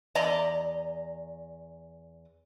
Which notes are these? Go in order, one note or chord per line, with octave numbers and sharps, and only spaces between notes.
E2 D5 D#5 A#5